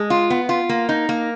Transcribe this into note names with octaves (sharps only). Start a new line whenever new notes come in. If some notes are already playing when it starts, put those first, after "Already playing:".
Already playing: G#3
F4
B3
F4
A#3
D#4
A#3